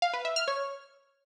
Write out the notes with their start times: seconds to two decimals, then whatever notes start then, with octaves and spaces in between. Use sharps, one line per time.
0.02 F5
0.13 B4
0.25 E5
0.36 F6
0.48 C#5